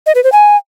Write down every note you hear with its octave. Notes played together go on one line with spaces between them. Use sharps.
D#5
B4
C5
G#5